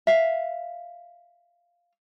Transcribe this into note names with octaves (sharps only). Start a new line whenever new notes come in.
E5 F5